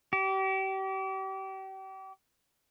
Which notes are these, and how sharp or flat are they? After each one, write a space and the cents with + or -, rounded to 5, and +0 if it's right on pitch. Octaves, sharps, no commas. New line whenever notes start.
G4 -35